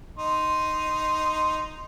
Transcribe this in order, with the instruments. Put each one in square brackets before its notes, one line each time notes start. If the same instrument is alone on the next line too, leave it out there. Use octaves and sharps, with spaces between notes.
[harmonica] D#4 C6